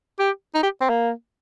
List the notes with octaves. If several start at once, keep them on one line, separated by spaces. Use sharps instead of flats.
G4
D#4
G4
C4
A#3